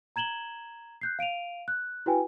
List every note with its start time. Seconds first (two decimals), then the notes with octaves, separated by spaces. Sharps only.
0.16 A#5 G#6 E7 F#7 G7
1.01 F#6 G6 C7
1.19 F5 D7 D#7 F7
1.68 F#6
2.06 E4 F#4 B4 G5 G#5